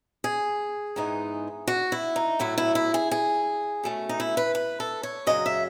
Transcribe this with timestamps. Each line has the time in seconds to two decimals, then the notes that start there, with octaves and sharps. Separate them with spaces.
0.24 G#4
0.96 G#2 E3 B3 D#4
1.68 F#4
1.92 E4
2.16 D#4
2.39 A2 F#3 B3 E4
2.58 E4
2.75 E4
2.94 G#4
3.11 G#4
3.83 B2 A3 C#4
4.09 D#4
4.20 E4
4.37 B4
4.55 B4
4.80 A4
5.03 C#5
5.27 F#2 C#3 F#3 D#5
5.46 E5